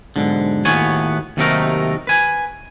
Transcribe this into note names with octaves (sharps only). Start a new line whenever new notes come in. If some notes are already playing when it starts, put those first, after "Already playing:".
B1 G#2 D3
D#2 A2 B3 F#4 C#5 G#5
D#2 C3 F#3 A3 D#4 A#4
B4 G#5